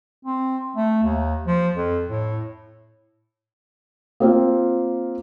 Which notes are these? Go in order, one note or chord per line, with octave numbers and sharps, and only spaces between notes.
C4
A3
D#2
F3
F2
A2
A#3 C4 F4 F5